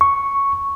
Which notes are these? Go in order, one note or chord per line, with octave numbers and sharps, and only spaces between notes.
C#6